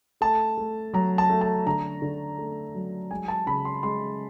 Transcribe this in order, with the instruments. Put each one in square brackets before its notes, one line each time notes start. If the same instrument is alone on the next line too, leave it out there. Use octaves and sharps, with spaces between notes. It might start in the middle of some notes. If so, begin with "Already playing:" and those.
[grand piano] A3 A5
A3
F#3 A#5
A5
A3
A5
D3 A#5
D3
A3
F#3
G#3 G#5
A5
C#3 B5
C6
G#3 C6